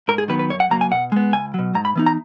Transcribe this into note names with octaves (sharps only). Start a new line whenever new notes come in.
G#2 A#4
G#4
D#3 F#3 B3 B4
B4
F#2 C#5
F#5
C#3 F#3 A#3 A#5
G#5
B2 F#5
G#3 B3
C#2 G#5
B2 F#3
G#2 A#5
B5
E3 B3 D#4
A#5